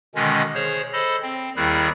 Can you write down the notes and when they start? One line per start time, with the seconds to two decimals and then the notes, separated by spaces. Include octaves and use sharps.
0.15 B2 D3 D#3 G#3 C#4
0.55 G#4 C5 C#5
0.93 A4 C5 D#5 B5
1.22 C4
1.56 D#2 D#3 G3 E4 G#4 F#6